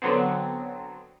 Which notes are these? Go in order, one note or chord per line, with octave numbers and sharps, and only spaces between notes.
D3 F#3 B3 C4